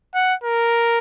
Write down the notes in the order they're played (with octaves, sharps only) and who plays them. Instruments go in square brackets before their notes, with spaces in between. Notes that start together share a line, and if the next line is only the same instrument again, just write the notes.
[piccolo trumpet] F#5
A#4